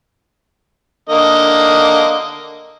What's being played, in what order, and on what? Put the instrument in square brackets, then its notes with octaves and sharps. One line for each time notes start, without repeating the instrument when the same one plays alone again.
[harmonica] D3 A#3 D#5